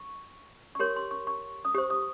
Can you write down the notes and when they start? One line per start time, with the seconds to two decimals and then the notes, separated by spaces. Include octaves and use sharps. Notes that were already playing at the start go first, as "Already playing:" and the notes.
Already playing: C#6
0.75 C#6
0.80 G4 A#4 C#5 C6
0.96 C6
1.11 C#6
1.27 C#6
1.65 D#6
1.75 G4 C5 C#6
1.90 D#6